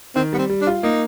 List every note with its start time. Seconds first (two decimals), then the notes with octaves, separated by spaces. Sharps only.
0.15 D#3 C4
0.33 G3 B3
0.38 C4
0.49 G3
0.61 D4
0.67 F4
0.83 A#3 D#4